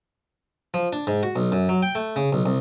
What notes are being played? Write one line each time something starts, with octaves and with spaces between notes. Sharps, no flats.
F3
D4
G#2
F#4
B1
F#2
F#3
G5
A3
C#3
B1
C2